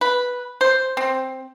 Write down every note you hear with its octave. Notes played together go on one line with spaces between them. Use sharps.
B4
C5
C4